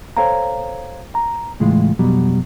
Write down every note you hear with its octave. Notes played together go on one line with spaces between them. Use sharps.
A4 C5 C#5 F5 G5 A#5
A#5
C#2 A2 E3 G#3 F4
F2 B2 F#3 G3